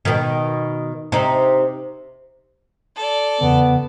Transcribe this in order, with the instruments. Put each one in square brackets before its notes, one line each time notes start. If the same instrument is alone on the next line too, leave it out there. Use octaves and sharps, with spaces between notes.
[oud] B2 D#3
C3 D#4
[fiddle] A4 D5
[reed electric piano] E2 C#3 [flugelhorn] B3